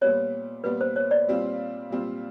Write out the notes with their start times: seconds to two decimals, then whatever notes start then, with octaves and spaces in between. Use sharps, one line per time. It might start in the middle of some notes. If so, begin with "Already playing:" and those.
0.01 A#2 G3 B3 C#5
0.64 A#2 G3 B3 B4
0.81 C5
0.96 C#5
1.11 D5
1.27 A#2 G3 C4 F4
1.90 A#2 G3 C4 F4